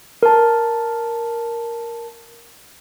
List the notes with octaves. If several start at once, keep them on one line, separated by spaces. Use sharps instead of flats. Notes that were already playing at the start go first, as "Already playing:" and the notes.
A#4 A5